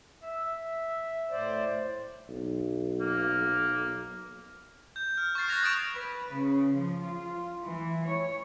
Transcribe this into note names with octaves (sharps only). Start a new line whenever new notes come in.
E5
A2 C5 D5
B1
A#3
G6
F6
C#6 F6 A6 C7
C#6 F#6 G#6 A#6 F7
C#6 D#6 A6 D7 E7 F7
B4
C#3
F3
F4
E3
C#5